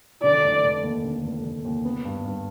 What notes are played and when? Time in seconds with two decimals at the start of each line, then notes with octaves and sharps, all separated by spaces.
0.23 D3 D5
0.44 F1
0.64 F1
0.83 D#2
1.04 D3
1.24 F1
1.44 F1
1.65 D#2
1.85 B3
2.05 G2
2.25 G2